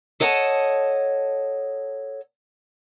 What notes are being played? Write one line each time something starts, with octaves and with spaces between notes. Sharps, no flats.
A4 C#5 D#5 F#5 G5 A5